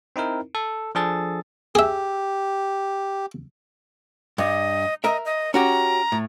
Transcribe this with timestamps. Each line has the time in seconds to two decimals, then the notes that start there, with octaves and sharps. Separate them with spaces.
0.16 C4 D#4 E4 A#4
0.55 A4
0.95 F3 D4 G#4 A4 A6
1.75 G4 G#4 E5
4.38 G2 D#5
5.04 A#4 D#5 E5
5.25 D#5
5.54 C#4 F#4 G4 A#5
6.12 A2